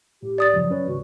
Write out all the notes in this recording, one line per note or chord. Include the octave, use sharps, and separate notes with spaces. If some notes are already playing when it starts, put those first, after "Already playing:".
A2 G4
D5 D#6 A6
F#2 C#3 F3 F#3
C#4 B4 C#5
D#2 G#2 C#3 F#4